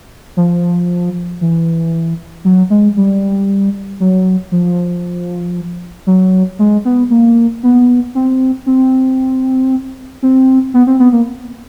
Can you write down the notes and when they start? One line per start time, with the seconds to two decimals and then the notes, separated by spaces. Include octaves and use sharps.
0.37 F3
1.41 E3
2.45 F#3
2.70 G#3
2.97 G3
4.00 F#3
4.52 F3
6.07 F#3
6.59 G#3
6.85 B3
7.10 A#3
7.63 B3
8.15 C4
8.66 C4
10.23 C4
10.74 B3
10.87 C4
11.00 B3
11.12 A#3